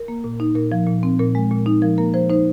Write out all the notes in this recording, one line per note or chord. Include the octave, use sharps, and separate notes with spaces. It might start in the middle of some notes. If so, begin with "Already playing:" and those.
Already playing: A#4
A#3
A#2
D#4
A#2 A#4
F3
A#2
C4
A#2 A#4
G#3
A#2
D#4
F3 A#4
A#3 A#4
F3 C5
D#4 C5